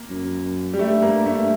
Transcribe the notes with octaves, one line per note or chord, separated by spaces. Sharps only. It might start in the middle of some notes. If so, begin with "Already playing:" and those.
Already playing: A#3
F#2
G3
G2 A3
G2 A#3
G2 A3